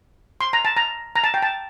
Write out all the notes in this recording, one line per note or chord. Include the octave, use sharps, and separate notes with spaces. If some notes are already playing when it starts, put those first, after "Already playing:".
C6
A#5
A5
A#5
A#5
A5
G5
A5